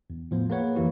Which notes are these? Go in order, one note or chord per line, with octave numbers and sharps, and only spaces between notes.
E2
A2 F3 B3
A#3 G#4 B4 C#5 F#5
F2 E3 A#3 E4 G4